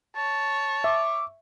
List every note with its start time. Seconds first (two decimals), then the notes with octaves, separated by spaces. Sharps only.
0.16 C#5 A5
0.84 E5 D6